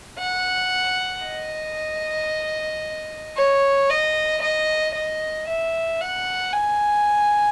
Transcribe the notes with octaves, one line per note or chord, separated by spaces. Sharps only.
F#5
D#5
C#5
D#5
D#5
D#5
E5
F#5
G#5